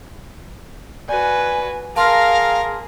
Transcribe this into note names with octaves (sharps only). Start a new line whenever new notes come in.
F#4 B4 D5 G#5
G#4 A#4 F5 A5 A#5 C6 F6